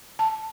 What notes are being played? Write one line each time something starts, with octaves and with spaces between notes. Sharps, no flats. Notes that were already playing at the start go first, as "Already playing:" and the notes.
A5